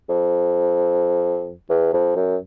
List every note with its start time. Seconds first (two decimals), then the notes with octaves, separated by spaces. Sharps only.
0.09 F2
1.70 E2
1.93 F2
2.16 F#2